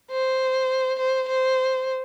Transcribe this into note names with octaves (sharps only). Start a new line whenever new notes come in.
C5
C5
C5